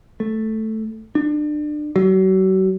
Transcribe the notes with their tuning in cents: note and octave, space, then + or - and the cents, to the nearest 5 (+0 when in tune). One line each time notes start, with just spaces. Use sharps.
A3 +0
D4 +30
F#3 +35